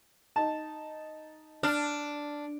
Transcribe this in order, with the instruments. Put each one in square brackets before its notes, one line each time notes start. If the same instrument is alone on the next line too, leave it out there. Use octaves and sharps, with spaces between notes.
[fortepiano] D#4 A5
[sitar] D4 [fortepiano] F6